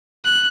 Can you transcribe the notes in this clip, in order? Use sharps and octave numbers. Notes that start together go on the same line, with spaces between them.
F#6